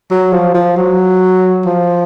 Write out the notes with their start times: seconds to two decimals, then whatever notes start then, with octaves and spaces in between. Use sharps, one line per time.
0.11 F#3
0.33 F3
0.54 F3
0.77 F#3
1.65 F3